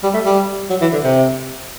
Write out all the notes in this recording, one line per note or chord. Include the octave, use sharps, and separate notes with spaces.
G3
A3
G3
F#3
E3
D3
C3